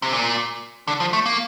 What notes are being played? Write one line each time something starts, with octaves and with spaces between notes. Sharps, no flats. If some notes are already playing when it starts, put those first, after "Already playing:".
C3
A#2
D3
F3
A3
A#3